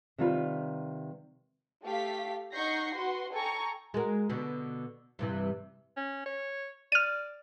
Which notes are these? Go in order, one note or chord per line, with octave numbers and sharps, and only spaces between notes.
C3 D#3 G3 F4 B4
A3 G4 A4 F5 B6
D#4 F#5 C#6 G6 A#6 C7
F#4 B4 F#5 C6
A4 G5 G#5 A#5 C#6
G#3 F#4 A#4
B2 D3
G2 C3 E3
C#4
C#5
D5 F6 D#7